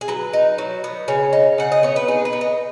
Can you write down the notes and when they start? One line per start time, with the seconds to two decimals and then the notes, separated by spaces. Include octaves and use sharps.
0.01 G#4
0.08 F#3 B4
0.33 D#4
0.58 F#3
0.84 B3
1.08 C#3 C#5
1.33 D#4
1.58 C#3 F#5
1.72 D#5
1.83 B3 C#5
1.96 B4
2.08 D#4 G#4
2.25 B4
2.33 B3
2.41 D#5